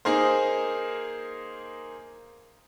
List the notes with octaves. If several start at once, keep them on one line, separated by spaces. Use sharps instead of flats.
A#3 D#4 G#4 A#4 C5